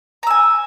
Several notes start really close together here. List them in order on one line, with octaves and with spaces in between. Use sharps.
A#5 E6 G#5